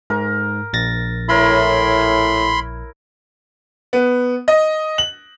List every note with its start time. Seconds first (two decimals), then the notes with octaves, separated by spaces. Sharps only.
0.10 G#2 A#4
0.73 A#1 A6 A#6
1.29 A2 E4 A#4 C#5 B5 C6
3.93 B3
4.48 D#5
4.98 F#7